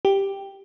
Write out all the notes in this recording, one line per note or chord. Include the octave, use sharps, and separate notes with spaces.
G4